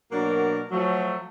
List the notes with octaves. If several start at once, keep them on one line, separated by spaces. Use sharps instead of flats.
B2 F#3 A#3 D4 F#4 A#4
F3 F#3 A3